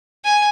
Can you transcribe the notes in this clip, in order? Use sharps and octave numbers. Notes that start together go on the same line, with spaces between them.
G#5